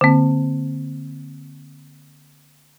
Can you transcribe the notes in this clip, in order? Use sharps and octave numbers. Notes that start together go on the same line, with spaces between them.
D3 A#3 C4